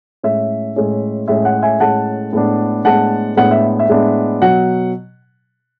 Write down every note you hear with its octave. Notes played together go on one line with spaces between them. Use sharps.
A2 G#3 C#4 E5
A2 G#3 C#4
A2 G#3 C#4 E5
F#5
E5 G#5
A2 G#3 C#4 F#5 A5
A2 G#3 B3 D4
A2 G#3 B3 D4 F#5 A5
A2 G#3 B3 D4 F#5
E5
E5
A2 G#3 B3 D4
B2 F#3 F#5